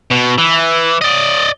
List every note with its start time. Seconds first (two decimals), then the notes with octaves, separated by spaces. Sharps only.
0.11 B2
0.39 E3
1.01 D5 D#5